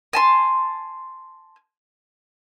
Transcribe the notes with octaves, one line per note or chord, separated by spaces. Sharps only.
G#5 A5 C6